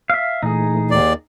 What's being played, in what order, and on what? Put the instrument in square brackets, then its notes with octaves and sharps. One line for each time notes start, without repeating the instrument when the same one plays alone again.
[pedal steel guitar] E5 F5
[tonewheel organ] A#2 E3 A3 [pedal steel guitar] D#4 G#4
[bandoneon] D#2 D5